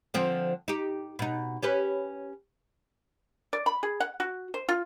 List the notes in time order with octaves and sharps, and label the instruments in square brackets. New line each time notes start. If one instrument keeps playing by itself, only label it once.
[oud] D3 F3 C4
D#4 G4
B2 D#4
C#4 G4 B4
[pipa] D5
B5
G#4
F#5
F#4
C5
F4